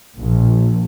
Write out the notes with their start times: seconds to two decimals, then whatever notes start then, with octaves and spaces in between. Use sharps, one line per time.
0.18 A#1